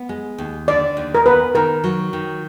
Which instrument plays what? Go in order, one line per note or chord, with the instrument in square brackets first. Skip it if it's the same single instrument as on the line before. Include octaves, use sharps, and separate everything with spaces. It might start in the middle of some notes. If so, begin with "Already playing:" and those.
Already playing: [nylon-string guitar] B3
G#3
D#2
[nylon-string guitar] D3 [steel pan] D5
[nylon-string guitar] D#2
[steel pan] A#4
[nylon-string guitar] B3 [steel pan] B4
[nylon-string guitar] D#3 [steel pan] A#4
[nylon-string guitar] F#3
D#3